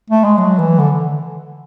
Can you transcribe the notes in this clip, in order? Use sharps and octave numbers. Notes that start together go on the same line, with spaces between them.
A3
G#3
F#3
E3
D3